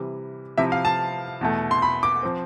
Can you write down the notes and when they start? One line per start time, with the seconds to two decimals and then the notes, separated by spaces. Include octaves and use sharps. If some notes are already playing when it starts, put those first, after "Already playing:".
Already playing: C3 E3 G3
0.58 C3 F3 C4 E4 E5
0.72 F5
0.85 A5
1.41 E2 B2 A3
1.71 C6
1.82 B5
2.03 D6
2.23 F3 C4